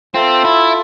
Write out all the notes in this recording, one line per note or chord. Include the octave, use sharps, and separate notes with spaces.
C4 F4 A4 E5
E4